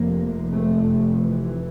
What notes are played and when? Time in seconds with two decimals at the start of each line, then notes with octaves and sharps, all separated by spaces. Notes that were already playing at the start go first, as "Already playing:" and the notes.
Already playing: F1 F2 C3 A#3
0.51 A3
1.18 E3